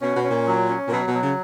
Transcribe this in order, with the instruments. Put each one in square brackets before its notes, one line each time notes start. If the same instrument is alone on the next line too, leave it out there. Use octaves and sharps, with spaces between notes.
[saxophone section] B2 [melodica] C#4
[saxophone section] B2
[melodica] C#4
[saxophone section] A#2
[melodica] F#3
C#4
[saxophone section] A#2
[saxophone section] B2 [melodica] F#3
[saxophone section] B2
[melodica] F#3
[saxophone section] C#3